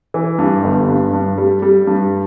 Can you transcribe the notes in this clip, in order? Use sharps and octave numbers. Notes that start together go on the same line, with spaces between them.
E3
G2
G1
G2
G2
G3
G3
G2